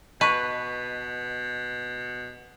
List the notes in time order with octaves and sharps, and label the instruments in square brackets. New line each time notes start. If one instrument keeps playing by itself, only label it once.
[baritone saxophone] B2 [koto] B4 [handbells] D#5 A5 C#6